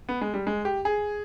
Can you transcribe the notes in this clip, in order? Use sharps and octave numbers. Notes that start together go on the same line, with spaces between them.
B3
G#3
G3
G#3
G4
G#4